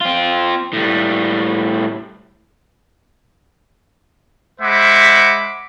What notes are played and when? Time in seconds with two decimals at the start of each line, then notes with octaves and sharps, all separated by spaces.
0.01 C4 F4
0.73 A2 G3
4.61 G#3 C5 E5 F#5 B5 D6